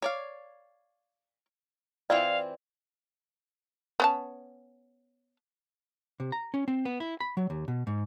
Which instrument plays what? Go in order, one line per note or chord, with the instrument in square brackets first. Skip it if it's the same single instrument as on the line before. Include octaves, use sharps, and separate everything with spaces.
[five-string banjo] C#5 D5 F5
[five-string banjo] E3 C4 F4 [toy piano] D5 [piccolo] F5
[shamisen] B3 C#4 A5
[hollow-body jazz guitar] C3
A#5
C#4
C4
B3
E4
B5
F#3
D#2
B2
G#2